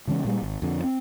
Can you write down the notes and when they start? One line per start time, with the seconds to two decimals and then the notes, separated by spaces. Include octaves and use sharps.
0.07 C#3 E3 G#3 C#4
0.25 A#2 G3 G#3
0.42 G#1
0.62 F2 D3
0.84 C4